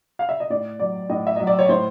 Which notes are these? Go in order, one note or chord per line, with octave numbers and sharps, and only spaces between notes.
F5
E5
D#5
A2 D5
F#3 D5
A2 D#5
E5
F#3 D#5
D5
C#5
A2 C5